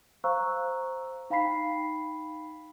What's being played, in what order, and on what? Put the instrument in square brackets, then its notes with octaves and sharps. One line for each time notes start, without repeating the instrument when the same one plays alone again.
[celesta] C5 F5 A#5 C#6 E6 F#6
D#4 F5 G5 B5 B6 C7